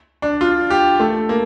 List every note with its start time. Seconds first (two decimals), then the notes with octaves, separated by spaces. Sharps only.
0.22 D4
0.41 F4
0.70 G4
1.00 A3
1.29 A#3